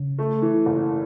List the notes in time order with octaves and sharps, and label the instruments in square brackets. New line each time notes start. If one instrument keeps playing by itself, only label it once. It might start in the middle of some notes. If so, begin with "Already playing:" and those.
Already playing: [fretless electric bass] C#3
[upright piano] A3
E3
F#1